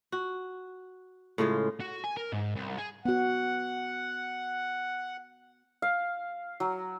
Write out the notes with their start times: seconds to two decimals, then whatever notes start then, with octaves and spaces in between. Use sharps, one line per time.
0.12 F#4
1.38 A2 C#3 G#3 F4
1.80 F#4
2.04 G#5
2.17 A#4
2.32 G#2
2.56 C2
2.78 G#4
3.05 B3 F#4 F#5
5.82 F5
6.60 F#3